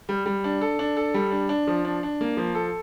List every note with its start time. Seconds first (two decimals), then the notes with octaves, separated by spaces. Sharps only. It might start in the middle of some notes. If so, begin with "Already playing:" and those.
0.09 G3
0.26 G3
0.44 D4
0.61 A4
0.79 D4
0.97 A4
1.14 G3
1.31 D4
1.49 D4
1.67 F3
1.85 D4
2.03 D4
2.21 A#3
2.37 F3
2.55 A4